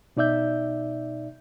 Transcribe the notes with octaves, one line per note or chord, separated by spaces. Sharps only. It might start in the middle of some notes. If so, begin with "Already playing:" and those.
B2 D#4 D5 E5 G6